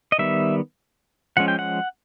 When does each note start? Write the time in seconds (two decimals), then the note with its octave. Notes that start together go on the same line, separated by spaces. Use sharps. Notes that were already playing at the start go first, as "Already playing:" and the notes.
0.12 D#5
0.19 D#3 G3 B3 E5
1.37 F3 G#3 C#4 F#5
1.48 G5
1.59 F#5